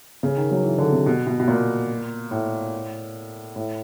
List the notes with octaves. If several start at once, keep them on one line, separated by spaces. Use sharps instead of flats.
C#3
D#3
F#3
E3
D3
C3
B2
B2
B2
A#2
A2
A2